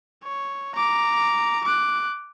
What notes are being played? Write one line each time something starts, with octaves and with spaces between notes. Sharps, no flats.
C#5
A#5 D6
D6 F#6